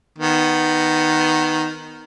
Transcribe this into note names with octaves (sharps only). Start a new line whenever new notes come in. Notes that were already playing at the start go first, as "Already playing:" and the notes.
D#3 B3